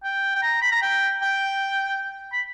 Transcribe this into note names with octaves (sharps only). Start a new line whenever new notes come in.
G5
G5
A#5
B5
A#5
G5
G5
B5